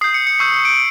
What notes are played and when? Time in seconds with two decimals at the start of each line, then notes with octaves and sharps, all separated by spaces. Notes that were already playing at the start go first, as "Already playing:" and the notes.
0.01 D#6 G6 C7
0.14 C#7
0.27 C#7
0.39 C#6 E6 G6 C7
0.52 C#7
0.65 D7